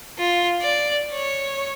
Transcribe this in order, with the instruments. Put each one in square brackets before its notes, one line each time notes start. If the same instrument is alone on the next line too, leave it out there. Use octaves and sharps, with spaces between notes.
[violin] F4
D5
C#5